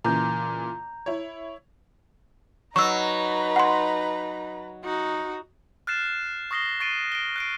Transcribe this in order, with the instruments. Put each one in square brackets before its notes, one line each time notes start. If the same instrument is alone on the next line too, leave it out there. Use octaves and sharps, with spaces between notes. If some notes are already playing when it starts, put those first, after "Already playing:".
[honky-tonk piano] A#2 C#3 E3 [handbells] A#5 G6
[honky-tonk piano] E4 C#5
[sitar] F#3 [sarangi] D#4 [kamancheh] B4 A#5 [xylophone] C#6 E6
[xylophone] F#5 C6
[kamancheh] D#4 [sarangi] F#4
[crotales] F6 F#6 A6 C7 E7
C#6 D#6 A#6 C7 G7
C#6 A6 C7 D7 D#7 G7
D7 G7
F#6 C7 D7